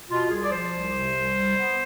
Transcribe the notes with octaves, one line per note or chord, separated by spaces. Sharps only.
B2 F4
C2 G#4
D5
F3 C5
C2
C3
C2
G3
B3